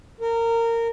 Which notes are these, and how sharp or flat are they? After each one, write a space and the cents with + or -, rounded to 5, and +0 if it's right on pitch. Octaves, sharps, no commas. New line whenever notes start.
A#4 -20